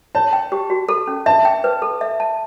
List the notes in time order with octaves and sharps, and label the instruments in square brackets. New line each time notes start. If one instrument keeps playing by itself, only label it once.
[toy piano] C#5 [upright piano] A5
[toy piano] G5
G4
F#4
A4
C#4
[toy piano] E5 [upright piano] A5
[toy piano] G5
B4
A4
E5
A5